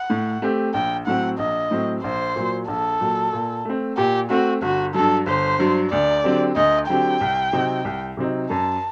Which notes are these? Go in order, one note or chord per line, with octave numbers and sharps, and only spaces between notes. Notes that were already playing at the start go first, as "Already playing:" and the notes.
Already playing: F#5
A2
A3 C4 G4
A#1 G5
A2 F#3 C4 F#5
A#1 D#5
A2 F#3 C4
A#1 C5
A#2 F#3
A#1 A4
A#2 F#3
A#2
A3 C4
A#2 G4
A3 C4 F#4
G1 F#4
G2 F#3 A4
G1 C5
G2 F#3
D2 D5
D3 F#3 C4 G4
D2 D#5
D3 F#3 C4 G4 G5
C2
C3 F#3 C4 D#4
C2
C3 F#3 C4 D#4
F#2 A5